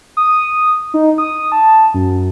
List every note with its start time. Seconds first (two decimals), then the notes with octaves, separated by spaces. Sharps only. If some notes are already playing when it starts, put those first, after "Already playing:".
0.17 D#6
0.94 D#4
1.18 D#6
1.52 A5
1.94 F#2